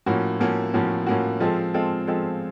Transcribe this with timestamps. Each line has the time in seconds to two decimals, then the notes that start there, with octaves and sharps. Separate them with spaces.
0.06 A2 F3 A#3 C#4 F#4
0.40 A2 F3 A#3 C#4 F#4
0.74 A2 F3 A#3 C#4 F#4
1.06 A2 F3 A#3 C#4 F#4
1.40 F3 G#3 C4 F4 A4
1.74 F3 G#3 C4 F4 A4
2.07 F3 G#3 C4 F4 A4